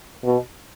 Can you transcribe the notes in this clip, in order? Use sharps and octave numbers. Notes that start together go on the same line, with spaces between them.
B2